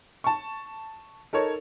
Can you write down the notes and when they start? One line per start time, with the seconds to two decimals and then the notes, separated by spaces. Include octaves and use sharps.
0.24 A5 C#6
1.33 D#4 A4 A#4 C#5